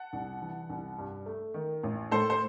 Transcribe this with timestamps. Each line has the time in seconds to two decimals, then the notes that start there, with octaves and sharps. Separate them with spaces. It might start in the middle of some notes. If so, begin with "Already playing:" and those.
Already playing: F#5 A5
0.13 C2
0.41 E3
0.70 C2
0.98 G2
1.26 A3
1.54 D#3
1.83 A1
2.11 A2 A4 C5
2.30 C5